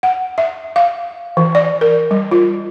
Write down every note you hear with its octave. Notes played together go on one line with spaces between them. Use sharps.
F#5
E5
F5
E3
D5
A#4
G3
F4